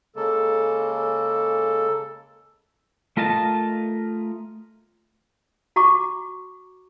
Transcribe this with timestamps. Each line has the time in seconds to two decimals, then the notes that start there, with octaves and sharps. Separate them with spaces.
0.16 C#3 G#3 A#3 A4
0.94 A4
3.17 A3 F4 A#4 D#5 A5
5.76 F#4 A#5 C#6 D6